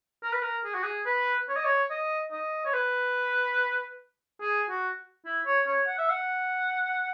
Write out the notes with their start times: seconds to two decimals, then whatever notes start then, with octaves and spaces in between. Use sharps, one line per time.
0.23 A#4
0.33 B4
0.42 A#4
0.64 G#4
0.74 F#4
0.84 G#4
1.06 B4
1.49 C#5
1.56 D#5
1.65 C#5
1.90 D#5
2.32 D#5
2.65 C#5
2.73 B4
4.42 G#4
4.69 F#4
5.26 E4
5.46 C#5
5.67 C#5
5.88 F#5
5.98 E5
6.10 F#5